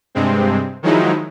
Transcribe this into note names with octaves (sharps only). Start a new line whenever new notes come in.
G2 C3 G#3 C4
D#3 F3 F#3 G#3 D#4 E4